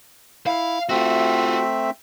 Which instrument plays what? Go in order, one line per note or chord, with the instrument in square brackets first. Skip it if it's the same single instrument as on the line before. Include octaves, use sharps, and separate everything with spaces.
[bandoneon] E4 [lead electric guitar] F5
[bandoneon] A3 C4 E5 [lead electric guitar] F4 F#4